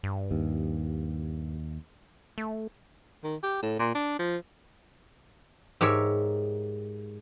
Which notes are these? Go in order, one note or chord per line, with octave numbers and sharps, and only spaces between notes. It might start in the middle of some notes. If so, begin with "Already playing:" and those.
G2
D#2
A3
D#3
G4
A2
A#2
D4
F3
G#2 G4 A#4 C#5 E5